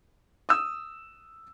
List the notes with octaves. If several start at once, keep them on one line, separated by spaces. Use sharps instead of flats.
D#6 E6